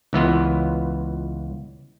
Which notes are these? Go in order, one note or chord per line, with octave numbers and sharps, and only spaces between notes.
C#2 E3 B3 F4